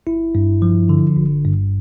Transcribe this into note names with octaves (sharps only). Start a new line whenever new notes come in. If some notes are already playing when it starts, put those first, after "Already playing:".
G1 E4
G2
F3
D3
G1
G2